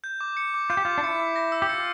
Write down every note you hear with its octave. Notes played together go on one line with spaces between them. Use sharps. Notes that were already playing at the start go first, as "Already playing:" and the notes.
G6
D6
C#7
D6
F4 G6
G4
F4 D6
D4
E4 C#7
D6
A#6
E6
G4
F4 C#7